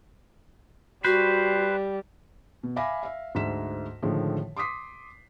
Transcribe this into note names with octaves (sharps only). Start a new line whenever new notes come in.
G3 F#4 B4 C5
B2
E5 F5 G#5 B5 D6 A#6
E5 F5
D2 G#2 E5 B6 E7
A2 D3 D#3 F3 G#3
C6 D6 D#6 B6 C7